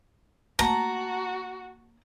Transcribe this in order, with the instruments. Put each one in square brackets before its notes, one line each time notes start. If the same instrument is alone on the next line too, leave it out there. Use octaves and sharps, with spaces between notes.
[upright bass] A3 A#3 [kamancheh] F#4 [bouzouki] A5 [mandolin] A#5